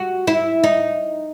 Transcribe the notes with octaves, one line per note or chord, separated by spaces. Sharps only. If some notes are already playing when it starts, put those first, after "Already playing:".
Already playing: F#4
E4
D#4